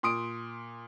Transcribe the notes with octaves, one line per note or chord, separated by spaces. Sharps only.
A#2 C6 D#6 D7